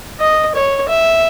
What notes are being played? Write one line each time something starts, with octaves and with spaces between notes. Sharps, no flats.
D#5
C#5
E5